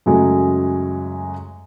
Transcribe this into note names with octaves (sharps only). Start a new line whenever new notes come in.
F#2 C#3 F#3 G#3 A3